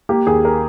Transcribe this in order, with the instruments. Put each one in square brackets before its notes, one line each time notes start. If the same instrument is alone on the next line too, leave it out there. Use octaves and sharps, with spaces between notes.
[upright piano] A#3 G4
D#2 G#4
A#4